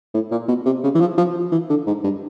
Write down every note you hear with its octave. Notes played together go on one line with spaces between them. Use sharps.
A2
A#2
B2
C3
C#3
E3
F3
F3
E3
D3
G#2
G2